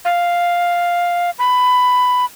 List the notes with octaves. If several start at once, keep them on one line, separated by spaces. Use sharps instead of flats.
F5
B5